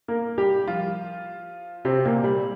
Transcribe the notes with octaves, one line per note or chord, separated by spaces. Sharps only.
A#3 A#4
G3 G4
F3 F4
C3 C4
A#2 A#3
G3